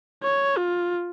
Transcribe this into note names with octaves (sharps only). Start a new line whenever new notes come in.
C#5
F4